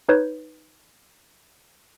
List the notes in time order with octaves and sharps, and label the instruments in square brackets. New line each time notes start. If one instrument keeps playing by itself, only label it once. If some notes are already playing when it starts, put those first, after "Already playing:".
[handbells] D#4 B4 C#5 G6